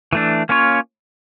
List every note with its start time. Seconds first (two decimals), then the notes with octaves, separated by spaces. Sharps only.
0.13 E3 A3 D4
0.49 A#3 C#4 F4 C#5